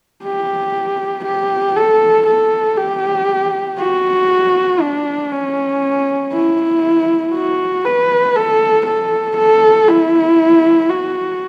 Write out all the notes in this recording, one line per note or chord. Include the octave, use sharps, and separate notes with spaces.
G4
G4
A4
A4
G4
F#4
D4
C#4
E4
F#4
B4
A4
A4
A4
E4
F#4